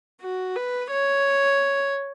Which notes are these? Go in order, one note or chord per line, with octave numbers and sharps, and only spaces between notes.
F#4
B4
C#5